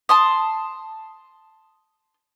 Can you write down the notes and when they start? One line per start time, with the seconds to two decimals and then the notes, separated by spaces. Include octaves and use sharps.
0.09 A5 C6 D#6